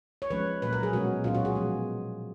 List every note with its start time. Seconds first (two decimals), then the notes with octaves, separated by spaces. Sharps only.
0.22 C#5
0.30 F3 G#3 C#4 B4
0.62 A#2 F#3 A#3 B4
0.73 A#4
0.83 G#4
0.93 B2 G#3 C#4 F#4
1.24 A#2 F#3 C#4 F4
1.35 F#4
1.45 G#4
1.55 F3 G#3 B3